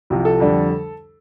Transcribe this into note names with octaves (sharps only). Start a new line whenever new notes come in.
C2 C3 F3
A4
F2 D3 G3 D4